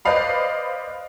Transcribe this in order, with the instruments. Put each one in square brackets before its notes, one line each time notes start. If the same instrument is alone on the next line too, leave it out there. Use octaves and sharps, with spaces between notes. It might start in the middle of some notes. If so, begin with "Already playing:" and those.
[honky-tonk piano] B4 C5 D5 D#5 F5 B5